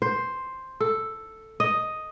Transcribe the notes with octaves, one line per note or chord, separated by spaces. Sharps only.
C5
A4
D#5